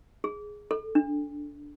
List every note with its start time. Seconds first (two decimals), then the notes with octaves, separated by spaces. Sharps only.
0.24 G#4
0.71 A4
0.95 D4